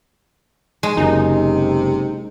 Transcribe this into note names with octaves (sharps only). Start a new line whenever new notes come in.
G#3
F#1 C3 D#4